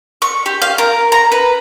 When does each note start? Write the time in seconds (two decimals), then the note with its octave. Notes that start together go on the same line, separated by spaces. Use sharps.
0.22 C#6
0.46 G4
0.62 F5
0.78 A#4
1.12 A#5
1.32 B4